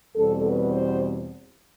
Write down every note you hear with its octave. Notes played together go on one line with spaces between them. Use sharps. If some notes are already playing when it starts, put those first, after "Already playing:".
E2 B2 G3 C4 A4
B4
C5